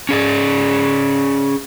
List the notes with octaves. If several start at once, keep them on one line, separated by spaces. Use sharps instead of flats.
C#4 G#4 D5